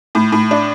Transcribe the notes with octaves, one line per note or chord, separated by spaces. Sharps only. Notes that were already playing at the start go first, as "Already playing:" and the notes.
A2
A2
D4